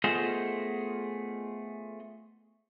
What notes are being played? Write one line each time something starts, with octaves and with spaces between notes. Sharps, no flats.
A3 B3 F4 G#4 C5 D#5